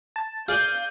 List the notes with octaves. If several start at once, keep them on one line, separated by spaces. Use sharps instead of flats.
A5
G#4 D5 F5 G#5 G6